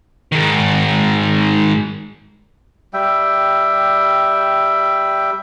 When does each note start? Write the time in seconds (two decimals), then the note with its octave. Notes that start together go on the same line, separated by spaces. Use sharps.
0.32 G#2 D#3
2.93 G3 E5 G5